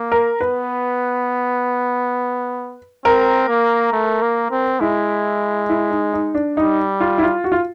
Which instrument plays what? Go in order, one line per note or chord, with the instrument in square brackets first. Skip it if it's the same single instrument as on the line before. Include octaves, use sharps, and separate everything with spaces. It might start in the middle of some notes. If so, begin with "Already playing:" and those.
Already playing: [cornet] A#3
[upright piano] A#4
[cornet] B3 [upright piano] B4
[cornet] C4 [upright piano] A#4
[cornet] A#3
A3
A#3
C4
[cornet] G#3 [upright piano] E4
[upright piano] E4
D#4
D#4
D4
[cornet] G3 [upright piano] D#4
[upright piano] F4
E4
F4
F#4
F4